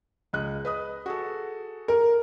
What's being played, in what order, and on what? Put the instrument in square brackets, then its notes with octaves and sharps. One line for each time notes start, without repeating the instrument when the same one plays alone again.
[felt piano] C#2 D#5 F#6
B4 D#5 D#6
F#4 G#4 A4
[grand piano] A#4